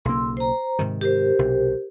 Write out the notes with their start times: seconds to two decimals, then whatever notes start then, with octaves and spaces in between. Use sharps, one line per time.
0.05 B1 C#3 A#3 C6 E6
0.37 C5 A#5
0.79 G#2 C3 D#3
1.01 G4 A#4 C5
1.39 B1 C3